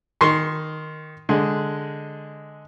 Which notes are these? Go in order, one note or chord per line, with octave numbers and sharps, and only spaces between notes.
D#3 C6 C#6
D3 G#3